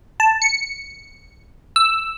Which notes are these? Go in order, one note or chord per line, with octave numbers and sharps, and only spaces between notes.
A5
C#7
E6